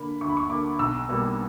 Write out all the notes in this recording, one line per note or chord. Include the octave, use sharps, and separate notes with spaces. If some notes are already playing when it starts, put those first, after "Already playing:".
Already playing: D3 A#3 B5
D2 C#6
B5
C#6
D3 A#3 D6
B1 E6
B2 G3 A#3